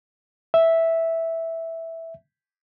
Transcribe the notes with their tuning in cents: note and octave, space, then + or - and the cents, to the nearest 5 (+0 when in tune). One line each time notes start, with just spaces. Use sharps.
E5 -5